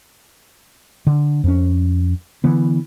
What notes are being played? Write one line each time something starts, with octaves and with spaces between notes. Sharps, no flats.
D3
F2 C#4
D3 E3 B3